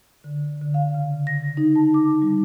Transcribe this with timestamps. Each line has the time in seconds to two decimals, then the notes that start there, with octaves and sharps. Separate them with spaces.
0.24 D3
0.61 D3
0.74 F5
0.94 C#3
1.27 A#6
1.57 D#4
1.76 A5
1.94 D6
2.22 G3